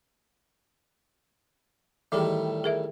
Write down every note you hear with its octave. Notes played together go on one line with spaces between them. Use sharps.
A2 D#3 E3 G3 G#4
G#4 A#4 E5